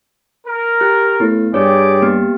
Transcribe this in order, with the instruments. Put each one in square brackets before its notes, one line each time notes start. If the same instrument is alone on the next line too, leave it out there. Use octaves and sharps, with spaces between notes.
[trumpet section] A#4
[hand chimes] G4 F#6
[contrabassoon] A2 [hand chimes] B3
[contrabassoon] G2 [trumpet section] G3 G#4 D6 [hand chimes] G4 C#5
[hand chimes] A#3 B3 G4